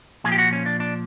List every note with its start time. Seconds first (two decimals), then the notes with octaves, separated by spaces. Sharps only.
0.24 A#2 F3 G#4
0.32 G4
0.38 F#4
0.53 C#4
0.66 D4
0.80 D4